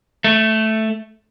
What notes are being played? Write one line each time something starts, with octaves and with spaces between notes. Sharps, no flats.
A3